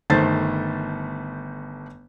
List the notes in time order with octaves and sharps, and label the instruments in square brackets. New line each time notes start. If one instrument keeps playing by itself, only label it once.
[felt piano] G1 D#3 A3 C5 A6